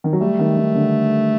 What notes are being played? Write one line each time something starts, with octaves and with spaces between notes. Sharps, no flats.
D#3
F#3
G3 A3
D#3
D#3
D3